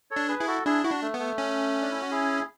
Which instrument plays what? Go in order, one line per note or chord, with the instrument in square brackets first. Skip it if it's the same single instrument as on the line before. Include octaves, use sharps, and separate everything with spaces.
[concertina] A4 C#5
[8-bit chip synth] D4
[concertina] G#4 B4
[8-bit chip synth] E4 [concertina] G#4
[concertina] F#4 A4
[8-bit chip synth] D4 [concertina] E4 G#4
[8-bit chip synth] E4 [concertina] F#4
[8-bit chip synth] D4
[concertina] A3
[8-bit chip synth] B3
[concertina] A3
[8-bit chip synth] C#4
[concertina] D4
E4
F#4
E4 G#4